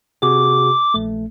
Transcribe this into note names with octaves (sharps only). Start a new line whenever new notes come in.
C3 F#4 G#4 D6
A#1 A3